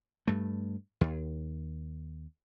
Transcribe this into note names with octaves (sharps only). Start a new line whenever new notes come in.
G2 A3
D#2